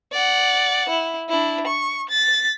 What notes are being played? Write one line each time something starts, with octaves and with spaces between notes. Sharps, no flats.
D5 F#5
E4
D4 E4
C#6
A6 B6